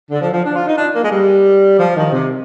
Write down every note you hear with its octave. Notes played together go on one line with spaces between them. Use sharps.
D3
F3
F3
D4
F4
D#4
D4
A#3
G#3
G3
F3
D#3
C3